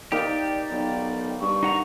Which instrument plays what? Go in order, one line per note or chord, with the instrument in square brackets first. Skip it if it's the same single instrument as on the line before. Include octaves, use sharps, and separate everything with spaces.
[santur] A#3 D#4 [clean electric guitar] G4 [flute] D5
[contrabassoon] B1
[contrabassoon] G2 [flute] C#6
[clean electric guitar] D#4 F#5 A#5